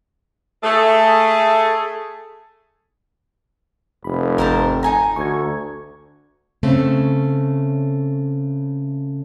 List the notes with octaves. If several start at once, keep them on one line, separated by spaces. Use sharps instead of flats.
A3 G#4
F1 B5
G#1 C4 A#4 C5 A5
D#4 G#5 A#5
D2 C#6 G#6
C#3 A3 C4